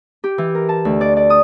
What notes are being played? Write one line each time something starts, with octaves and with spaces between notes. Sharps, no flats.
G4
E3
A#4
A5
D2
D5
D5
D#6